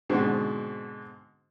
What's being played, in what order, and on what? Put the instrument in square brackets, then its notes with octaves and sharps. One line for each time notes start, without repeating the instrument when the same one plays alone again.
[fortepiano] G#2 B2 D3 C4 F#4